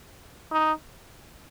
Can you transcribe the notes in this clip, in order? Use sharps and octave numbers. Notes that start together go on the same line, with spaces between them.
D#4